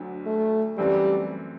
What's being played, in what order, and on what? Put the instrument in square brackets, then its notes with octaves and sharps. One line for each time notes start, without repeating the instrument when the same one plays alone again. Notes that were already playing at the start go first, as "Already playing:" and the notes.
Already playing: [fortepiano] D2 D3 F#3
[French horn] A3
[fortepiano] F#2 E3 A3 C4 [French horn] G3